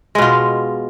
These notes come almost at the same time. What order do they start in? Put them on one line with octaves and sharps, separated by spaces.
G#3 B2 F4